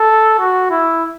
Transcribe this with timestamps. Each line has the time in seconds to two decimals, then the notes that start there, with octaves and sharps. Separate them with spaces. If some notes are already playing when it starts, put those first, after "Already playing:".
Already playing: A4
0.39 F#4
0.70 E4